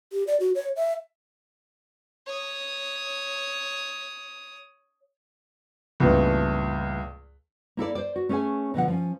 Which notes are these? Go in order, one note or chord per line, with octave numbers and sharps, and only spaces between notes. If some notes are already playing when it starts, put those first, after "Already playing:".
G4
D5
F#4
C#5
E5
C#5 D#6
C#2 G2 A#2 E3 A3 B3
A#3 E4 A4 D5
C5 D5
F#4
A3 C#4 G#4 C5 C#5 G#5
B2 D3 F3 F#5
F3 C#4